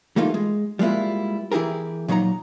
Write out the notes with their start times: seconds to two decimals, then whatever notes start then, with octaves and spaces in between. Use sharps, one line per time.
0.16 E3 G3 A3 A#3 D#4 F4
0.34 G#3
0.79 G3 G#3 A#3 E4 F4
1.52 E3 E4 G4 G#4 A#4
2.08 A#2 F#3 D#4 A#4 A#5